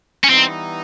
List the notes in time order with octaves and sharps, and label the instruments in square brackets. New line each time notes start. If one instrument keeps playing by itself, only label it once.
[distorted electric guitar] C#4
[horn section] E3 G3 B3 D#4 [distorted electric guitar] C4